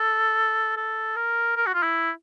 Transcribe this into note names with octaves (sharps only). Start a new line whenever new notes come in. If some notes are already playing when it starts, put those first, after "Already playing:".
Already playing: A4
A4
A#4
A#4
F#4
F4
E4